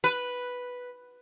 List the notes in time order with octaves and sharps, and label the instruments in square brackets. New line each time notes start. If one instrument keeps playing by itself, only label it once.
[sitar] B4